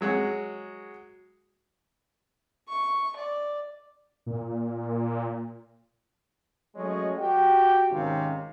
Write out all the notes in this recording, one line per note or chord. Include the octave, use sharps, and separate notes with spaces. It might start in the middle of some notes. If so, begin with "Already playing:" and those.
F#3 G#3 F#4
C#6
D5
A#2
F#3 G#3 A3 C#4 C#5 D#5
F#4 G4 G5
G#1 C3 D#3 C4 C#4 F5